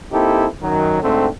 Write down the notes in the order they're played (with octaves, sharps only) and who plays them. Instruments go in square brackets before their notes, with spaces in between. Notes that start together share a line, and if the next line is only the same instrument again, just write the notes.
[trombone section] A#3 C4 D#4 E4 G4 A4
F#2 D#3 F#3
D2 G#2 D3 A3 C4